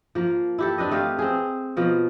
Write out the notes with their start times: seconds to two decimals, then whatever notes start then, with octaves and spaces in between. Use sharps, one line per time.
0.15 F3 A#3
0.58 E4 G4 A4
0.78 C4 D4 B4 D#5
0.91 A3 G4 D#5 F5
1.19 C4 G#4
1.77 B2 F3 A#3